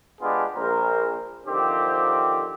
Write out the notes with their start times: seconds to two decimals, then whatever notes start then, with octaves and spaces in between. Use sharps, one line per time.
0.22 G#3 B3 D4 F4 G4 G#4
0.57 A#1 A#4 C5
1.47 D3 D#3 F3 C4 G4